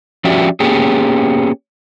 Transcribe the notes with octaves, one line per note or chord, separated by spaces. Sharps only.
F3 C#4 F#4 G4 D5 E5
A#3 B3 C#4 G4 G#4